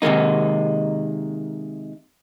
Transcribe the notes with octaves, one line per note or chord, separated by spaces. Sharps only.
C3 D#3 G#3 A#3 D#4